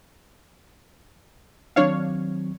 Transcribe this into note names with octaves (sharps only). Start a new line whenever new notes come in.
D#3 F#3 C4 D4 C#5 F5